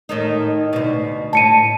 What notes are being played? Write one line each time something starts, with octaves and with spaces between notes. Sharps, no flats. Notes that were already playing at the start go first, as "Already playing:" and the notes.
A2 D#3 D#4
D2 B2
A2 A5 C#7 D#7